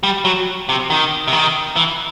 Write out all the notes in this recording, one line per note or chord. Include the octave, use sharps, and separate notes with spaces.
G3
F#3
C3
D#3
C3
D#3
E3